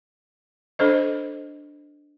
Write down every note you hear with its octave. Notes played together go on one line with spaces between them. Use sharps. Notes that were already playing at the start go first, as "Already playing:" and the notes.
D4 A4 C5 D#5